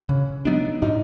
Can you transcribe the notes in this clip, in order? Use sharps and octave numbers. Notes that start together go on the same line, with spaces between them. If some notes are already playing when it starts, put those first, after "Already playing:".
C#3 C#4
F#3 B3 D4 D#4
A2 D#4